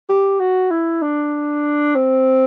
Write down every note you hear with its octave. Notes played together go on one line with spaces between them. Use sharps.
G4
F#4
E4
D4
C4